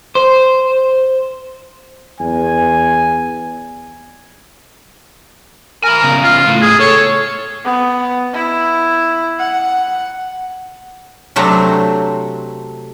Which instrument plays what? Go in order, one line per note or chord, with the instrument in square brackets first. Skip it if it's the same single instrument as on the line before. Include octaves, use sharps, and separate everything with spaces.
[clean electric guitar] C5
[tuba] E2 [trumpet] G#5
[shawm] A#4 [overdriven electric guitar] G#5 B5
[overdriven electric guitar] C#3 B3
[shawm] F4
[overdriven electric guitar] A2
[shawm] G#4
[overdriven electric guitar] A4 [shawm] C#5
[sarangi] B3
E4
F#5
[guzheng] C3 F#3 A3 D4 C5 A#5